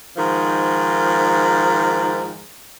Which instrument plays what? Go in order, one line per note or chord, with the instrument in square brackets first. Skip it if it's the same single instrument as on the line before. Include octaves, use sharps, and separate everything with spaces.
[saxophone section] G#2 D#3 F3